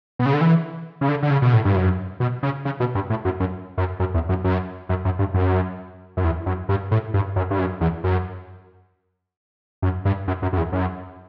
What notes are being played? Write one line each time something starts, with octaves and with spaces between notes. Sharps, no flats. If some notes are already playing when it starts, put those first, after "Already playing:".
B2
C#3
D3
E3
C#3
D3
D3
C#3
B2
A2
G2
F#2
B2
C#3
C#3
B2
G2
A2
F#2
F#2
F#2
F#2
E2
F#2
F#2
F#2
F#2
G2
F#2
F#2
E2
F#2
G2
A2
G2
F#2
G2
F#2
E2
F#2
F#2
G2
F#2
F#2
F#2
E2
F#2